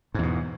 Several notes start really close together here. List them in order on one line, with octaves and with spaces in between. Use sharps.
G#2 E2 B2